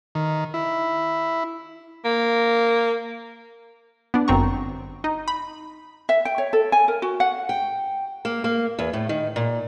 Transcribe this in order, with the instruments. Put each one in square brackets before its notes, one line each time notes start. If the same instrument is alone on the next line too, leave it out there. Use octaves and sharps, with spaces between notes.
[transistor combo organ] D#3
E4
[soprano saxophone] A#3
[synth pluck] B3 D4
G1 F#2 C4 A#5 C#6
D#4
B5
[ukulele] E5
G5
C#5
A4
G#5
A#4
F#4
F#5
[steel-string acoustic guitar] G5
A#3
A#3
E2
A2
D#3
A#2